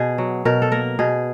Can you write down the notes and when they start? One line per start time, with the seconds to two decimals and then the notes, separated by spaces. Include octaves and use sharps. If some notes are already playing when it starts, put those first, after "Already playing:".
Already playing: B2 G#4
0.18 F#3
0.45 B2 A#4
0.62 A4
0.72 A#3 A#4
0.99 B2 G#4